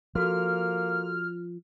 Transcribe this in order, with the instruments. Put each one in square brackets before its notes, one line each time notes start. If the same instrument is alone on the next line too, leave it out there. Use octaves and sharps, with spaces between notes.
[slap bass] F3 [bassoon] A#3 [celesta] F#4 A4 C6 [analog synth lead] F6